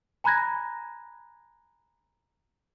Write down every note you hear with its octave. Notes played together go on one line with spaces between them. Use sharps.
G#5 A#5 B5 F#6 G#6 A#6